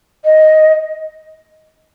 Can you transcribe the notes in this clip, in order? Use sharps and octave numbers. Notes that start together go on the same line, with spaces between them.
D#5